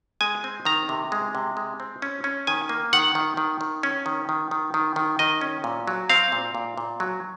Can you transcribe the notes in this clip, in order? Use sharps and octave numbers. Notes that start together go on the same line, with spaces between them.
G#3 G#5
C4
D#3 A#5
C3
G#3
C3
G#3
C4
C#4
C#4
D#3 G#5
A#3
D#3 F#5
D#3
D#3
D#3
C#4
D#3
D#3
D#3
D#3
D#3
D#3 D#5
C#4
A#2
F#3
C4 F5
A#2
A#2
A#2
F#3